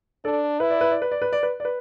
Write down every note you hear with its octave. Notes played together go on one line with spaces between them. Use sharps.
D4 A4 D5
E4 B4
D5
B4
D5
B4
D5
B4
D5
B4
D5
B4